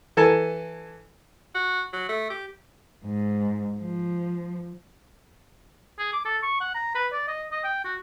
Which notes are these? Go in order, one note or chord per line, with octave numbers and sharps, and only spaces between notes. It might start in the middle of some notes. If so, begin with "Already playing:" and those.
E3 A4 G#5 A5
F#4
F#3
A3
G4
G#2
F3
G#4
D6
A4
C#6
F#5
A#5
B4
D5
D#5
D#5
G5
F#4